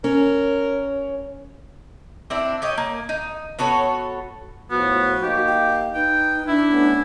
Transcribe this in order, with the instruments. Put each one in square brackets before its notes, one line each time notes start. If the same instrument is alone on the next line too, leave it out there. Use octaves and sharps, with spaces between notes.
[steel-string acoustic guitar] C#4 [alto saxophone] A#4
[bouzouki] C4 D4 E4
G4 C#5 D#5
A#3
D#4
B3 F#4 A4 C#5
[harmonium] A2 F3 [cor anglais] B3 [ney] F#4
[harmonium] A#3 D#4 [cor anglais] G4
[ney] G5
[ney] D#4 [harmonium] B4 [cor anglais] G5
[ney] D4 [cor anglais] E4
[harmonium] A3 B3 C#4